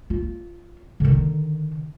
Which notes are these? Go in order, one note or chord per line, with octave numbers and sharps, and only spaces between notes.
F4
D3 D#3